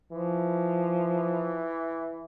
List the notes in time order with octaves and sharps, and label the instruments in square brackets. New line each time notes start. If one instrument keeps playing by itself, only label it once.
[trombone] E3 [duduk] F3